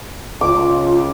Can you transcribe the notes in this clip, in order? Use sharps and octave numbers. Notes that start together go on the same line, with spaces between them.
C#2 F4 D6